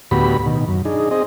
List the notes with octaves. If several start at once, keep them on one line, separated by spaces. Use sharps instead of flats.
D2 A2 B3 F#4 G4 B5
B2 D#3
F#2
D4 D#4 G#4
C4 G#4 D#5